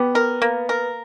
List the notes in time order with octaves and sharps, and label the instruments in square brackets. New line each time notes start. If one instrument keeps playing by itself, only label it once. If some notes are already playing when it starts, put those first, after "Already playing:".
Already playing: [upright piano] B3 [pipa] G4
[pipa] A#4
A#3
A#4